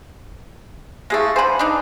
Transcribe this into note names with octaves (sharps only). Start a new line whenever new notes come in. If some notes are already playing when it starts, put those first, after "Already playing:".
G#3 A3 E4 G#4 F5
D3 C5 F5 G#5 B5
D4 D#4